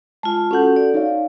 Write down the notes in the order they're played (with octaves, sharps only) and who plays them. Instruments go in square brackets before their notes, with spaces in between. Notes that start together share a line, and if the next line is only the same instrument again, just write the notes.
[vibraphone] G#3 F4 [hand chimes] A5
[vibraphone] C#4 F#5 [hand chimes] F#4 A4 G6
[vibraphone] D5
[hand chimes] D#4 C#5 F5